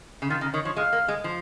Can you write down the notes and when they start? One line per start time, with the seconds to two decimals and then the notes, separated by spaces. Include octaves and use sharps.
0.22 C#3
0.30 D#3 F4
0.41 C#3 A#4
0.54 D#3 C#5
0.65 F3 C#5
0.76 G#3 F5
0.93 A#3
1.08 G#3
1.24 F3